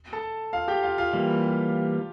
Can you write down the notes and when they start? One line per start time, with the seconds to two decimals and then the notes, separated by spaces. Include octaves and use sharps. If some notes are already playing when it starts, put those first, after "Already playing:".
0.13 A4 A5
0.53 F4 F5
0.68 G4 G5
0.83 F4 F5
0.98 F4 F5
1.13 E3 G3 A#3